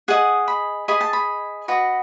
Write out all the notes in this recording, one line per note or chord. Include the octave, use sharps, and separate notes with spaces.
G#4 D#5 F#5
B5
G#4 D#5 B5
A5
B5
F#4 B4 D#5